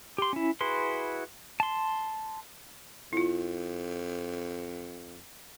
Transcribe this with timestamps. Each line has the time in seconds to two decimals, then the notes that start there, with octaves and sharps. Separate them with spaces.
0.18 G4 C6
0.33 C#4 E4
0.61 E4 F#4 G#4 B4 C6
1.60 A5 C6
3.13 F2 E4 F4